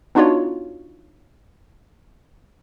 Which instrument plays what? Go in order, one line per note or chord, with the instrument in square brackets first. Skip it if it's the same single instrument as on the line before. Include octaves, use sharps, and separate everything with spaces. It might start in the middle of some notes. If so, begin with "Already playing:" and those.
[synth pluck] B3 D4 D#4 F4 F#4 C#5